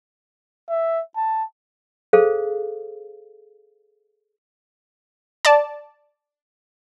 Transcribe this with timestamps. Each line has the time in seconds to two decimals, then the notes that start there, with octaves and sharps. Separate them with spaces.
0.69 E5
1.16 A5
2.13 G#4 A4 C5 F5
5.45 D5 A5